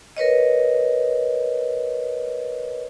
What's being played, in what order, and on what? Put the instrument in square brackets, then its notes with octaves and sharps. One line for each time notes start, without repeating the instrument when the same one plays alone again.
[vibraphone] A#4 B4 C#5 D#5